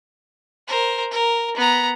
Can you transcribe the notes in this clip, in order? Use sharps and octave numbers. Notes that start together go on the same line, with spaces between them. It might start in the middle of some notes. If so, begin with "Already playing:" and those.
A#4 C5
A#4
B3 A#5